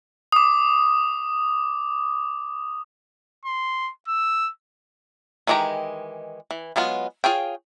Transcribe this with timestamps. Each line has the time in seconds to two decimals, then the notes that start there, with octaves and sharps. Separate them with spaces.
0.32 D6 D#6
3.45 C6
4.08 E6
5.47 D#3 E3 G#3 G4 A#5
6.51 E3
6.76 F#3 G#3 B3 F4
7.24 F4 G#4 C#5 G5